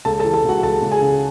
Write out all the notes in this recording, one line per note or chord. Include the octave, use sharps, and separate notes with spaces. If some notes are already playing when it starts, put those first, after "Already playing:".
C#2 A4 A5
A4 A5
E3
A4 A5
C#2 F#4 F#5
C#2 A4 A5
C#2
G#4 G#5
C#3